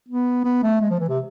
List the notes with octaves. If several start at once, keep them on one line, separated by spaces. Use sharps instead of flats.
B3
B3
A3
G#3
F3
E3
C3